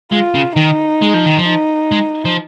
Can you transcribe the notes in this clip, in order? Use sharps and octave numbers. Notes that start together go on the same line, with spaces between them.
G#3 F4
C#3
D#3 D#4
G#3
F3
D#3
F3
D#4
G#3
F3